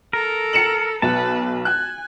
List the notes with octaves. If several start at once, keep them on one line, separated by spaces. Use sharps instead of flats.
A4 A#4 A#5
C#7 E7 F#7
B1 B4 A5
G#5 F#6